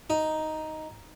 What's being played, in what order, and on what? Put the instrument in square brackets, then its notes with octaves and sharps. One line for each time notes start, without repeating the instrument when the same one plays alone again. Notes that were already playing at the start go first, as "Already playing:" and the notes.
[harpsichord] D#4